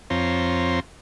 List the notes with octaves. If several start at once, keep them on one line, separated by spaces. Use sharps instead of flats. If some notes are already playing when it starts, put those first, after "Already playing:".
F2 C4 F4 C#5 A#5 C6